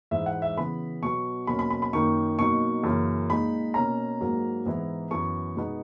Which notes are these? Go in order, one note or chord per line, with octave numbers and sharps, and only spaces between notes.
G#2 E3 G#3 E5
F#5
E5
C#3 E3 B3 B5
B2 F#3 B3 C#6
B2 F#3 A#3 C#4 B5
B5
B5
B5
F#2 D#3 A#3 D#4 C#6
B2 F#3 A#3 D#4 C#6
F#2 C#3 E3 A#3 C#4
A#2 G#3 D#4 B5
B2 A#3 C#4 A#5
G#2 F#3 A#3
G#2 E3 B3 E4
F#2 E3 B3 C#6
B2 G#3 B3 D#4